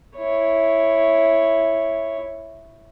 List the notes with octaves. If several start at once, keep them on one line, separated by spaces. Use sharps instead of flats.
E4 C#5